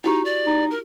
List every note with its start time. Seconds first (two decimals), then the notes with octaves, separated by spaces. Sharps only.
0.04 D#4 E4 F#4 G4
0.25 D5
0.47 D#4
0.71 A#4